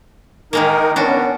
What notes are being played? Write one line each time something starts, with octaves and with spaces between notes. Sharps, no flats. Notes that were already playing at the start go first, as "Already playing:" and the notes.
D#3 G#3 A#3 D#4 A#4
B3 C#4 D4 F#4